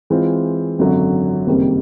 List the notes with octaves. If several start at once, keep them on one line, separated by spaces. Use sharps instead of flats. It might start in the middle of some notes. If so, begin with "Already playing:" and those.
E3 G#3 C4 F4
G#1 F#2 D3 F#3
F#1 F2 C3 D#3 G3